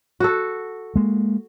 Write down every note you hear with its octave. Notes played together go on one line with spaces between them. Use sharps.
F#4 A4
G#3 A#3